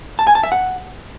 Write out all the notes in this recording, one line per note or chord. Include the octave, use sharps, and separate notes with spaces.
A5
G#5
A5
E5
F#5